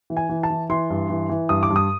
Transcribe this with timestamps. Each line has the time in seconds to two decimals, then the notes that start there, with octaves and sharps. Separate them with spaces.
0.10 E3
0.17 G#5
0.29 E3
0.43 A5
0.50 E3
0.70 E3 C6
0.90 G2
1.10 E3
1.29 E3
1.49 G2 D#6
1.63 D6
1.70 G2
1.76 D#6